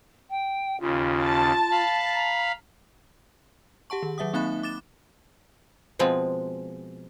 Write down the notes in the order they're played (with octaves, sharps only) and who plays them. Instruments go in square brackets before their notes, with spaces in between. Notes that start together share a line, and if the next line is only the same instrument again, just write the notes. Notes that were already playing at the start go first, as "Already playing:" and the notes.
[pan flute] G5
[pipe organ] D#2 C#3 [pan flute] F4
[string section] A5
[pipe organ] F5 B5
[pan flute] A#5
[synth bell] G4 F#5 A5 C#6
D#3
D#3 F#3 E5 F#5 D#6
A#3 C4 D#4 E5 B5 F#6
D6 A6 E7
[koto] B2 F3 G#3 C4